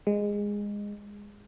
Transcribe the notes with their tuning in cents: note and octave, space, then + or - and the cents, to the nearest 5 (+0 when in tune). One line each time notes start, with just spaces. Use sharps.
G#3 -15